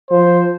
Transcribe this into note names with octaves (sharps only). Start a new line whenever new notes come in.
F3 C5